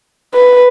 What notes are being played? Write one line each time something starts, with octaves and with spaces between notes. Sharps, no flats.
B4